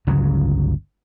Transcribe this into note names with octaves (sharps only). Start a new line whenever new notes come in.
G1 C#2 C#3 F#3